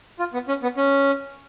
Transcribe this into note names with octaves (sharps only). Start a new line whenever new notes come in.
F4
B3
C#4
B3
C#4